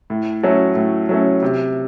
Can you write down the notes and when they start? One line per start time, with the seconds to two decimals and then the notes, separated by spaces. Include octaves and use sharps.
0.10 A2
0.43 F#3 A3 C#4
0.76 A2
1.09 F#3 A3 C#4
1.42 C3